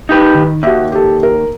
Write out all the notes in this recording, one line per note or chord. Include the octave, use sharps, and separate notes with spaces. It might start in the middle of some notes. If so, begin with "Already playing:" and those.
D#4 G4 B4
D#3
D#2 F#4 E5
G4 A4
A#4